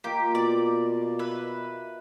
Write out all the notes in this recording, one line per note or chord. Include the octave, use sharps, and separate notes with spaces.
A#3 F4 G4 D#5
B2 D5
B4 E5